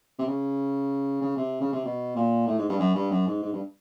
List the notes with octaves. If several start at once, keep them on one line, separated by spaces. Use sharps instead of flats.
C3
C#3
C#3
C3
C#3
C3
B2
A#2
A2
G#2
G2
F#2
G2
F#2
G#2
G#2
G2